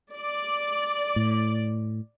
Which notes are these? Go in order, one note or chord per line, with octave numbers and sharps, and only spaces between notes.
D5
A2